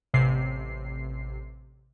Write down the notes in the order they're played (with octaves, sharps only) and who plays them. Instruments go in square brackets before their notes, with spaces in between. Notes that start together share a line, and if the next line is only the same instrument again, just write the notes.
[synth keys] A1 C3 C7